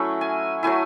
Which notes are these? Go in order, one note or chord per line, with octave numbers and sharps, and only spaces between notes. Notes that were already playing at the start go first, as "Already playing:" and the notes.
Already playing: F#3 A3 C#4 E4 E5 F#5
G#5
F#3 A3 E4 G#5